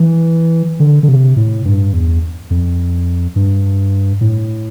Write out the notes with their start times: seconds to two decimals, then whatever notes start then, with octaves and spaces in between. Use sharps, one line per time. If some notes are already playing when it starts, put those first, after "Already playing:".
Already playing: E3
0.80 D3
1.03 D3
1.08 C3
1.36 A2
1.65 G2
1.93 E2
2.50 F2
3.36 G2
4.21 A2